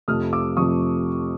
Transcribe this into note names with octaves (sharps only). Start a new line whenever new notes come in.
F2 C3 F3 A3 D#6 F6
D6 E6
F2 C3 F3 A3 C#6 D#6